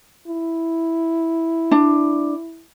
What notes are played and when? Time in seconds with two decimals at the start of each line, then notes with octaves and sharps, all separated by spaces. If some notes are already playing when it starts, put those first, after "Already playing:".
0.27 E4
1.71 D4